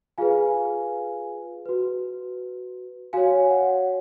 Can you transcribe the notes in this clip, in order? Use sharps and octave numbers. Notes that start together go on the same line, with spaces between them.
F4 G#4 B4 F5 G#5
F#4 B4
F#4 C#5 F5 G#5
F#5